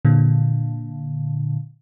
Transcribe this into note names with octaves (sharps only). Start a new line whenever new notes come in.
A#2 D3